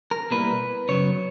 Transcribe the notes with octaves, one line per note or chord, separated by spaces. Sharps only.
A#4
B2 G3 A#3 E4 B4
F#2 C#3 F#3 B3 C#5